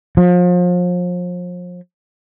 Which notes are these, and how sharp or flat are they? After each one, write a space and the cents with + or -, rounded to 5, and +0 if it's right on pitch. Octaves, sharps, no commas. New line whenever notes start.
F3 +35